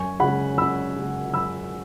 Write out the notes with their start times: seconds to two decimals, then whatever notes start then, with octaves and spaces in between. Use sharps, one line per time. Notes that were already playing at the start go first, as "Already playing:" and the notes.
Already playing: F#2 G#5 C#6
0.20 C#3 G#3 F#5 B5
0.58 F#2 B5 E6
0.96 C#3 G#3
1.34 F#2 B5 E6